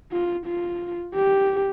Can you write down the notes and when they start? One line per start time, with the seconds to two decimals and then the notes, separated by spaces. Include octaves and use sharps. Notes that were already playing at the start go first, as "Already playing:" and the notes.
0.12 F4
0.46 F4
1.15 G4